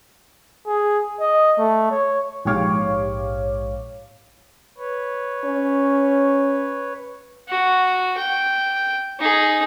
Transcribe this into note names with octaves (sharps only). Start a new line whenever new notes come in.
G#4
D#5
A3
C#5
A#1 G#2 G4 C#5 F5 D6
B4 C#5
C#4
F#4
G5
D#4 G#4